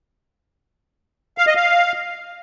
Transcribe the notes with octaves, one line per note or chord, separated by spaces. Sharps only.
F5
D#5
F5